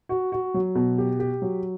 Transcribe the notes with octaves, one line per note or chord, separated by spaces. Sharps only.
F#4
F#4
F#3
B2
G4
G4
F#3